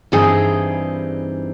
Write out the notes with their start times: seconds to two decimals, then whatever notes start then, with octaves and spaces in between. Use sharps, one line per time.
0.12 G2 E3 G3 C4 D#4 G#4